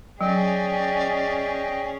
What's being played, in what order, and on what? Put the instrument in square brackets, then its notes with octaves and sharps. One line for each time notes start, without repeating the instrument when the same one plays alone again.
[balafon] F#3 [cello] C#4 G#4 [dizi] D5 [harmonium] D#5 G5